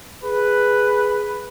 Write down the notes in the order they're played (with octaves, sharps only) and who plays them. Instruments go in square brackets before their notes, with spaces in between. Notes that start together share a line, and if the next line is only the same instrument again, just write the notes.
[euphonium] G#4 [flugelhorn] B4